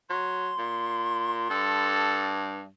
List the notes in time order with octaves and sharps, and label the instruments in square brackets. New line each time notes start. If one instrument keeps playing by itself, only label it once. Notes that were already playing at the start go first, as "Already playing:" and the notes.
[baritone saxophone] F#3 [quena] C6
[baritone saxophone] A#2
[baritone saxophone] G2 [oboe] A4